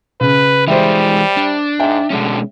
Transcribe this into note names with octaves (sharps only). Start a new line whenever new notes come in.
C#3 B4
E3 G3 G#3 C5 E5
D4
G#2 E5 G5
B2 D3 G#3 C#4